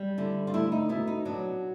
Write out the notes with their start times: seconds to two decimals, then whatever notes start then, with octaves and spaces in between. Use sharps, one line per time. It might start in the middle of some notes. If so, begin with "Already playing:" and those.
Already playing: G3
0.18 D3 E4
0.47 F4
0.54 A3 E4
0.72 D#4
0.89 B2 E4
1.07 D#4
1.25 F#3 D4